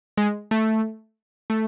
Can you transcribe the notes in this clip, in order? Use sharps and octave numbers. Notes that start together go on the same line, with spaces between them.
G#3
A3
A3